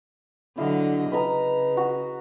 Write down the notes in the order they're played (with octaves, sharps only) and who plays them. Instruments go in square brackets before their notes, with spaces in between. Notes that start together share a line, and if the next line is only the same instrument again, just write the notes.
[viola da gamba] D3 F#3 D#5 [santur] E4 F5
[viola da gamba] C#3 [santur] B4 D#5 A#5
[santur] F#4